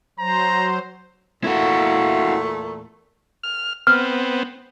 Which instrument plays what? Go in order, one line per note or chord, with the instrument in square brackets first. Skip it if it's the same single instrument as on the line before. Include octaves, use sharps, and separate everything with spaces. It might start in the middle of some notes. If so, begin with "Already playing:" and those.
[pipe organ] F#3 C5 [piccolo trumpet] A#5
[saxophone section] E2 A#2 A3 [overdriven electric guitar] E4 F#4
[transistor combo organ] F6
[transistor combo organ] B3 C4 [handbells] F6